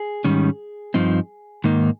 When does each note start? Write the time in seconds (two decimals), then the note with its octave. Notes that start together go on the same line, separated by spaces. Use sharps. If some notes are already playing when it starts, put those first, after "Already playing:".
Already playing: G#4
0.24 G#2 D#3 G3 C#4
0.94 G2 F3 C4 D#4
1.64 G#2 D#3 A#3 D#4